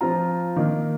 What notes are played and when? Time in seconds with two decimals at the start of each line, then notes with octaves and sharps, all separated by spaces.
0.01 F3 C4 F4 A#5
0.56 D#3 A#3 D#4